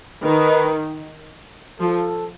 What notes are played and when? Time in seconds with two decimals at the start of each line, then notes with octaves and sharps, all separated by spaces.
0.24 D#3 B4
1.80 F3 A4